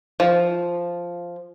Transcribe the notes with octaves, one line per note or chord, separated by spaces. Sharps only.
F3